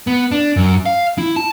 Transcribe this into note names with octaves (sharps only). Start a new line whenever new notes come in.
B3
D4
F#2
F5
E4
A5